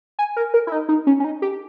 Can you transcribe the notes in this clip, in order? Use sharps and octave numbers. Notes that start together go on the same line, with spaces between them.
G#5
A#4
A#4
E4
D#4
D#4
C#4
C#4
D#4
G4